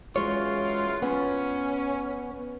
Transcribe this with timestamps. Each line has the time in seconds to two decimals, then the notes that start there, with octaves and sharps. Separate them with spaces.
0.16 F#2 E3 G#3 F4 C#5
1.02 B3 C#4